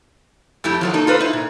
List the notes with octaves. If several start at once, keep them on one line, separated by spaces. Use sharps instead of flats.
F2 A3 E4 G4
F3 F#3 A4
A#3 D#4 A4
F4 A4 B4 C5
D#4 E4
A#2